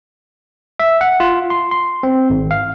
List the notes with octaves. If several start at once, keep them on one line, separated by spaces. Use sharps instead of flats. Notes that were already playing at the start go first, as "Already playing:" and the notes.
E5
F#5
F4
C6
C6
C4
G#1
F5